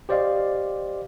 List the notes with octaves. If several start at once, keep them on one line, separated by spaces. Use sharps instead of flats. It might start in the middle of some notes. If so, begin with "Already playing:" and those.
G4 C5 D5 D#5 F5